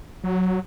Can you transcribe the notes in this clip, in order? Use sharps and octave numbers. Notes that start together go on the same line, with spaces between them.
F#3